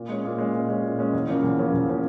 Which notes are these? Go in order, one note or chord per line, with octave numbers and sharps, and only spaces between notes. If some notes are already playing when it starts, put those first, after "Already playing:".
Already playing: A#2
G#3 C#4
A#2
G#3 C#4
A#2
G#3 C#4
A#2
G#3 C#4
E2
C#3 F3 A#3 C#4
E2
C#3 F3 A#3 C#4
E2
C#3 F3 A#3 C#4